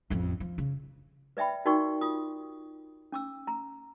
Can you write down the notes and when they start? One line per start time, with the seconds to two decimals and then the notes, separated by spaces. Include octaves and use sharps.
0.10 A1 F2
0.40 F3
0.58 C#3
1.37 B4 D5 E5 G5 B5
1.65 D#4 F#4 A#4 D5 G5 C#6
2.01 F4 D#6
3.12 C#4 D6 E6
3.47 A#5